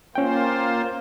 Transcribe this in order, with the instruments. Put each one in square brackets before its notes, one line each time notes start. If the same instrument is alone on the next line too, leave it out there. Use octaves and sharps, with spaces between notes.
[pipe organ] A#3 F4 C5 [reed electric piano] C#4 G5